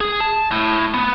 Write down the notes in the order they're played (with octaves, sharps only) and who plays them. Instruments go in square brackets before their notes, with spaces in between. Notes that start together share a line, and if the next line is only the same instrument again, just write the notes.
[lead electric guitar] G#4
A5
A2
B3